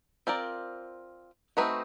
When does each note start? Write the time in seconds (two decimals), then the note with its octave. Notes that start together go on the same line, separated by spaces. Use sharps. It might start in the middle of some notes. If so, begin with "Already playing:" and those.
0.27 C4 F4 A#4 D5
1.57 A3 C4 D#4 F#4 B4